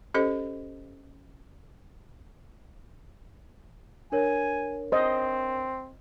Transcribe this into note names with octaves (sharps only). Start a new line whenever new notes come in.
C#4 G4 A4 C5 D#5
D4 A#4 C#5 G#5
C4 C5 D#5